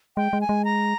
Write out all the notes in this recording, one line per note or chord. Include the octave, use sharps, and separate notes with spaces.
G#3 G5
G#3
G#5
G#3
A#5